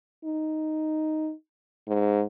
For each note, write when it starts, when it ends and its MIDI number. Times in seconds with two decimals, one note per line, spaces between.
0.25 1.33 63
1.87 2.23 44